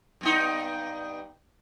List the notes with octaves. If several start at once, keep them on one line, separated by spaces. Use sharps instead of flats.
G2 B3 D#4